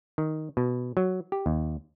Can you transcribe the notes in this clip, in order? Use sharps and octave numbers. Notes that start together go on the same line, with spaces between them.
D#3
B2
F#3
G4
D#2